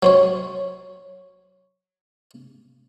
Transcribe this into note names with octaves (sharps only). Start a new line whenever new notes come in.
F#3 C5 C#5